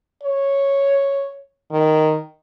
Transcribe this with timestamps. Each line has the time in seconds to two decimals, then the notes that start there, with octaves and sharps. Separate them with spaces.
0.23 C#5
1.71 D#3